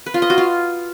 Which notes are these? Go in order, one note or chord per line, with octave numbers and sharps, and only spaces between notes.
B4
F4
D#5
F#4
F4